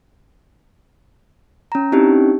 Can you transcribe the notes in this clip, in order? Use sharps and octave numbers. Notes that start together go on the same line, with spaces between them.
C#4 A#5
C4 C#4 D#4 E4 G4